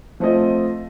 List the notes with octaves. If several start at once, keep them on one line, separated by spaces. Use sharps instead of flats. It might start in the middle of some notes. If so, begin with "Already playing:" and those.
F3 A3 C4 F4 D#5